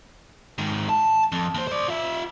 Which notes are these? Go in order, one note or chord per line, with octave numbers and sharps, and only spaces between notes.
G#2 D#3
A5
F2
D#2 C5
C5 D5
F4 E5